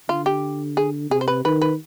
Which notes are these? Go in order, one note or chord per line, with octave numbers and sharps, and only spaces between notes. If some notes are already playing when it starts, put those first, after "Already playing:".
D3 F4
G4
G#4
C3 G#4
C5
B4
D#3 B4
B4